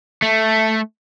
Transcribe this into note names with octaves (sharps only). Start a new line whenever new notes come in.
A3